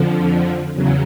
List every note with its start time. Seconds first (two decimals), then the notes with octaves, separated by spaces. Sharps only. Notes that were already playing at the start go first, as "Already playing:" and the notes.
Already playing: F2 D3 F3
0.74 E2 C#3 F#3